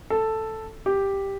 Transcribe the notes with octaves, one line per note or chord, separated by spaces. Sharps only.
A4
G4